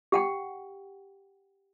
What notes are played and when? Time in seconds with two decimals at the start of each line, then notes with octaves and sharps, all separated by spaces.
0.12 G4 F#5 G5